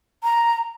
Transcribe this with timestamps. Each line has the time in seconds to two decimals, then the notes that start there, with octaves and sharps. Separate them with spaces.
0.24 A#5